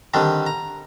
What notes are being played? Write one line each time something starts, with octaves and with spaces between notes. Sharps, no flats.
D3 D#3 G3 C4 D4
A#5